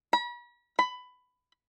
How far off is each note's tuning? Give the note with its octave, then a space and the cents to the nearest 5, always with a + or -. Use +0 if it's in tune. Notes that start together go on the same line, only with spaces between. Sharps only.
B5 -40
B5 +15